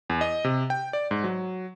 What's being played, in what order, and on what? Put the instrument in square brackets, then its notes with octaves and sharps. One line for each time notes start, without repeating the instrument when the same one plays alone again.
[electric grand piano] E2
D#5
C3
G5
D5
G#2
F#3